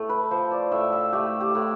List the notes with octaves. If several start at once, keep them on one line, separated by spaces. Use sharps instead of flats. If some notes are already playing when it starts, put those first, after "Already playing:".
Already playing: A2 A3 A4
B4
F3 C5
D5
A2 E5
E5
A3 G4
G4
A2